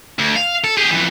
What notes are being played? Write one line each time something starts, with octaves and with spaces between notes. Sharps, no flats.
D2
F5
A4
G4 G#4
F2 E3